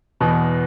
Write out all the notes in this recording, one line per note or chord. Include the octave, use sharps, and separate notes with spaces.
E2 B2